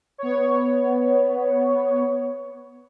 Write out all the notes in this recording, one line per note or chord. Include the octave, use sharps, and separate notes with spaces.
B3 C#5